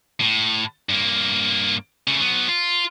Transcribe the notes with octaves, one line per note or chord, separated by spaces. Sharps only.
A2
G2 A#3
C#3 A3
F#3 B3
F4